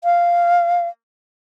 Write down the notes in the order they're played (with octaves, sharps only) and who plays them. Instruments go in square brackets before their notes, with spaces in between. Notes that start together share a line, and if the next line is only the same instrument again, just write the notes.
[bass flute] F5